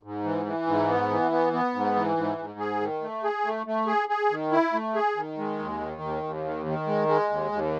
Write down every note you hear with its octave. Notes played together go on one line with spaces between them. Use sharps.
G#2
E3
E3
G#2
B3
E3
B3
B3
G#2
E3
G#2
G#2
G#4
D#3
A3
G#4
A3
A3
G#4
G#4
D#3
E4
A3
G#4
D#3
G#3
D#2
D#3
D#2
D#2
D#3
D#3
G#3
G#3
D#2
D#2